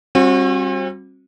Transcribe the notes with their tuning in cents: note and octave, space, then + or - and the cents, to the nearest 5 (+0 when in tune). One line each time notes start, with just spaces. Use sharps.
G3 +0 C4 +40 F#4 -30